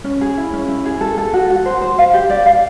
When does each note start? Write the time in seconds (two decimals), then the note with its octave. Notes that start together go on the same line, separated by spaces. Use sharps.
0.04 C#4
0.21 G#4
0.38 E4
0.53 C#4
0.69 E4
0.86 G#4
1.01 A4
1.18 A4
1.34 F#4
1.50 F#4
1.66 C5
1.82 C5
1.98 F5
2.13 G4
2.30 D5
2.46 F5